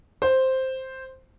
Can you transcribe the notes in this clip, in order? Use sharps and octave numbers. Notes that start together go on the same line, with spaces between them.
C5